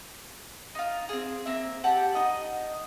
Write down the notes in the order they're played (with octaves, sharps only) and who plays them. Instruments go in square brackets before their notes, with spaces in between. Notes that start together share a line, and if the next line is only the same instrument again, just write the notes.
[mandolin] D#4 F4
C4 G#4
A#3 C4 E5
G4 F#5 A5
D#4 D#5